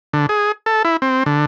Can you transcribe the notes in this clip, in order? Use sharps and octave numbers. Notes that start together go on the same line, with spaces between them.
D3
G#4
A4
E4
C4
D3